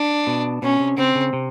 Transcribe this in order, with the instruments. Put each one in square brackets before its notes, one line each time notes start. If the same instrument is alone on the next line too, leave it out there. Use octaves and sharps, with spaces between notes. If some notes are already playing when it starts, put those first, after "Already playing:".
Already playing: [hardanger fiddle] D4
[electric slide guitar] B2
[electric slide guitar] B2 [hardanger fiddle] C#4
[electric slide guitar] C3
[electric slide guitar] C#3 [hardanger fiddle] C4
[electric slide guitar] C#3
C3